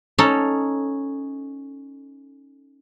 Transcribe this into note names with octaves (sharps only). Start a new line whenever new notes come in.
C#4 D#4 A4